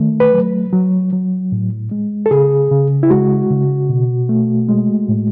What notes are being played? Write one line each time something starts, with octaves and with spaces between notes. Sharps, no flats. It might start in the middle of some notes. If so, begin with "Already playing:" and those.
Already playing: D#3 A3
B4
F#3
F#3
F#3
A2
G#3
A4
C#3 G#4
C#3
E4
G#3 F#4
C#3
B2
A3
G#3
A2